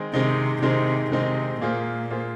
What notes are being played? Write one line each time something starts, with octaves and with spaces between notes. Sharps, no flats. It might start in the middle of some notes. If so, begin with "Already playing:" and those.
Already playing: D#3 G#3 C4 D#4
C3 D#3 G#3 C4 D#4
C3 D#3 G#3 C4 D#4
C3 D#3 G#3 C4 D#4
A#2 A#3 F4 G#4 C5
A#3 F4 G#4 C5